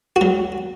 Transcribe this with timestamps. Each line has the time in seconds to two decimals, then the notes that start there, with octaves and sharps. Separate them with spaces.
0.16 F#4
0.21 F#3